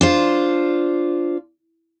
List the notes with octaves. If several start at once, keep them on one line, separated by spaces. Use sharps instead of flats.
D4 F4 C5